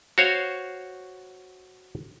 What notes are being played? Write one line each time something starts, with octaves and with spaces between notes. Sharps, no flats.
F#4 C5 C#5 F5